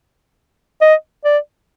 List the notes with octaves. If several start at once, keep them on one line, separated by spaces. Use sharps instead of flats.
D#5
D5